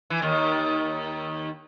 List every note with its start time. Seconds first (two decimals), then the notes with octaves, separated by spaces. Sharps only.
0.10 E3
0.22 D#2 D#3